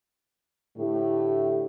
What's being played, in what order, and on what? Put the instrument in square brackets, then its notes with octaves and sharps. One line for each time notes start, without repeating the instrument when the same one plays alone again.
[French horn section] A2 D3 A3 E4 G4